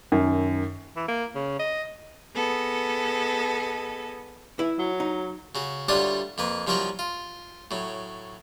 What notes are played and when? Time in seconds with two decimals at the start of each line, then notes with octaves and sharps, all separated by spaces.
0.12 F#2 D#3
0.96 E3
1.08 A#3
1.35 C#3
1.59 D#5
2.34 B3 G#4 A4 D#5
4.59 E4 B4 E5
4.78 F#3
5.00 D#4
5.55 C#3 F#4
5.88 D2 G3 D4 F4 C#5 F#5
6.38 F2 A#3 B4
6.67 C2 F3 F#3 A#4 G5 C#6
6.99 F4
7.71 A2 F#3